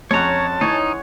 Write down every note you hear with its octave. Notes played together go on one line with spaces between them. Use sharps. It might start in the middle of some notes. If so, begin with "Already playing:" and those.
F2 G#3 C#4 C#5 F#5 A5 A#5
E3 D#4 C#5 G#5